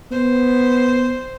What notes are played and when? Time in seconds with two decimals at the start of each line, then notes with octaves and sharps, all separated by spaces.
0.12 B3 C5